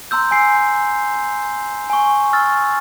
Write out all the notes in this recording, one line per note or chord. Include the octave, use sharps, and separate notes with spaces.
A#5 C6 E6 G6
G#5 E6 C7
G#5 C#6
C#6 E6 F6 A6